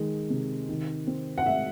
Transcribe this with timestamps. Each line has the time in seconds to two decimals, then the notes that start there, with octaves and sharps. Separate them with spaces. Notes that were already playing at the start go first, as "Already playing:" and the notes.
Already playing: D#3 G#3
0.30 C3
0.69 D#3
1.07 C4
1.38 F#5
1.46 G#3 E5